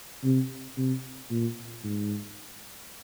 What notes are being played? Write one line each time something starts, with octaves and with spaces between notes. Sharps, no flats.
C3
C3
A#2
G#2